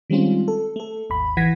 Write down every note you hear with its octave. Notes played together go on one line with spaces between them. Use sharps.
D#3 G3 G#3 C4 C#4 F4
A4
A3 A4
G#1 D#2 B5
A1 E3 F#5 G#6 A#6 B6